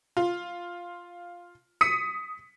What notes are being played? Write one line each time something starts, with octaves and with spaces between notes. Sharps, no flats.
F4
D#6 B6 C#7 D#7